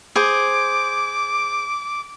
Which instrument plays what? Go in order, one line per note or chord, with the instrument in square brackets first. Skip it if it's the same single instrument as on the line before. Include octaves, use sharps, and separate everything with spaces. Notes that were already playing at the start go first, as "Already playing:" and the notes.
[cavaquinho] G#4 C5 [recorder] D6